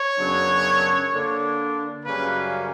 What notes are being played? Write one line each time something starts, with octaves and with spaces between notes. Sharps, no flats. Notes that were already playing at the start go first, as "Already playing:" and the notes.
Already playing: C#5
F#2 C#3 F#3 B3 D4
D3 A#3 D4
F#2 C#3 G3 A#3 C#4 B4